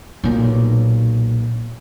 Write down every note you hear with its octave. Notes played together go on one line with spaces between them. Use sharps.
B1 A#2